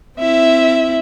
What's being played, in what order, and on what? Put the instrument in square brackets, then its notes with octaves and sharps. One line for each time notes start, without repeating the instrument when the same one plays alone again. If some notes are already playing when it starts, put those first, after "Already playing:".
[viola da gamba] C4 E4 [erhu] E5